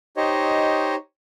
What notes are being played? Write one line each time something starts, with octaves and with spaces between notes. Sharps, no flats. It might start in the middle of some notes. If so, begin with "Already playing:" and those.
D#4 G4 C5 C#5 D#5